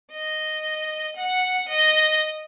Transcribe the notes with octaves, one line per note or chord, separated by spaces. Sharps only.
D#5
F#5
D#5